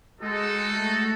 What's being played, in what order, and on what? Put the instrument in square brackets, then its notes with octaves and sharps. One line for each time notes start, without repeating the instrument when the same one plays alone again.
[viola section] G#3 [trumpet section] D#4 F#4 A4
[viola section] A3